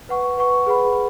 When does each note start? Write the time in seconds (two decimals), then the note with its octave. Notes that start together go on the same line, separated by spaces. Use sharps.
0.09 B4 F#5 C#6
0.38 B4 F#5 C#6
0.66 G#4 B4 F#5 B5